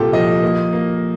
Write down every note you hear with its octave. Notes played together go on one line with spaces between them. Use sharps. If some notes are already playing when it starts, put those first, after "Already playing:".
Already playing: C2 A#2 A#3 F4 G4 A4
F3 D#5
A#3
A#3